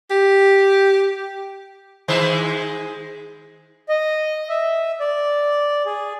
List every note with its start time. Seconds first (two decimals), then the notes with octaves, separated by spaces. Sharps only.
0.11 G4
2.08 D#3 G#3 C5
3.88 D#5
4.49 E5
5.00 D5
5.86 G#4